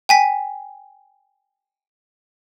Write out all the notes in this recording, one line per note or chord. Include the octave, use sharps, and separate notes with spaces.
G5 G#5 B6